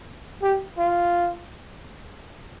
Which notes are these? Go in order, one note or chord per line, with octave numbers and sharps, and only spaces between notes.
G4
F4